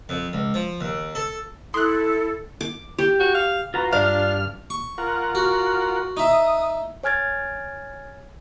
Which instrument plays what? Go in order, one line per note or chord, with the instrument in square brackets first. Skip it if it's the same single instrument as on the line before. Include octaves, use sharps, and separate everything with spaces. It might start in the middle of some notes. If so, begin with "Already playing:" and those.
[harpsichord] F2
C#2
F3
D#2
A4
[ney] E4 [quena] A4 [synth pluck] C6 F#6 [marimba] D#6
[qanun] D6
G4
[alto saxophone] F#4
F5
[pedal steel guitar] F4 A#5 [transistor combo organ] F#4 B4
[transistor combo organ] G2 F6 [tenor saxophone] D4 [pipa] F5
[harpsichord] C#6
[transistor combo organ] F4 A#4 F#5
[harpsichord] F#4
[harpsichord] D#4 E5 [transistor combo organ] D#6
[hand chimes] C#5 G#5 F6 G#6 A6